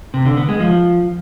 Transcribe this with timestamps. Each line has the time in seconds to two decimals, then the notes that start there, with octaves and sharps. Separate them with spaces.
0.14 C3
0.25 D3
0.37 B3
0.49 G#3
0.60 F3